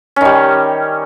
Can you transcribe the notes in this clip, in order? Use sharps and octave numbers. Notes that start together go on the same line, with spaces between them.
D#3 G3 C#4